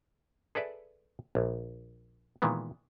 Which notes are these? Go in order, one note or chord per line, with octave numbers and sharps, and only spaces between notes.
G#4 A4 B4 D5 E5
A#1
A#2 D#3 E3 G#3 B3